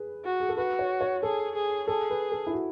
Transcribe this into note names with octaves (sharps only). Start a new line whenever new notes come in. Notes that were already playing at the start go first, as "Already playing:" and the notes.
Already playing: G#4 B4
F#4
G#4
A4
F#4 B4
C#5
C#5
G#4 A4
G#4
G#4 A4
B4
A4
E4
F#4